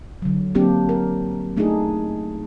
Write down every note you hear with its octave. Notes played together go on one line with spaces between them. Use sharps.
D3 F#3
F#3 A#3 C4 D4 G4
A#4
A3 D4 D#4 F4 G#4